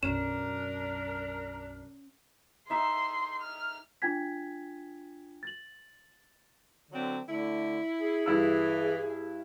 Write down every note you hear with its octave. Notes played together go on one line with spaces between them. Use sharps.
B1 F#2 C#4 D4 A#4 E7
D#4 E5 C6 E6
F6
D4 F4 G5 G#5 G#6 B6
A6 F#7
D3 F#3 C4
D3 A3 E4
G#4
G2 E3 E4 E6